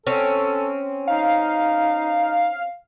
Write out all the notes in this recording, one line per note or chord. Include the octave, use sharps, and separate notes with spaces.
C4 C#4 A4
D#4 F5